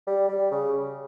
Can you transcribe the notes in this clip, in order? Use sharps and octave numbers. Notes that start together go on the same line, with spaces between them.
G3
G3
C#3